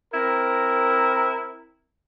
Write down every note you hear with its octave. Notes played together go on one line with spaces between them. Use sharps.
C4 E4 A#4